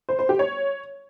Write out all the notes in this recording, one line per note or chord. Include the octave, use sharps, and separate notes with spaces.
C5
C5
G4
C#5